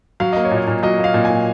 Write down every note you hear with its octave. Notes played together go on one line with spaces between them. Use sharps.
F#3 F5
A#3 D#5
C#5
A#2
D#5
A#2
F#3 D#5
A#3
F5
A#2
A#2 G#5